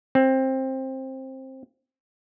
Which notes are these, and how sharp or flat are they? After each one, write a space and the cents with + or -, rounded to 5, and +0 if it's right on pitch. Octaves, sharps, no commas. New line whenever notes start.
C4 +15